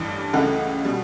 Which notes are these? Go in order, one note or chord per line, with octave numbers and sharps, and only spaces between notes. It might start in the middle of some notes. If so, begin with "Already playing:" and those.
Already playing: A1 G2 E3 A5
C#2 C#3 E3 A3 F#5
B2 G3